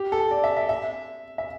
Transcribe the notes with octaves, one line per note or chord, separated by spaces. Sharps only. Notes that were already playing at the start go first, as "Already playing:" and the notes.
Already playing: G4
A4
D5
E5
E5
E5
E5